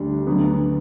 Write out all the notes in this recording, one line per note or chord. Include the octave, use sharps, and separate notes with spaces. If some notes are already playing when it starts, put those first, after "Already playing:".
Already playing: D2 D3 G3 D4
D2 D3 F#3 B3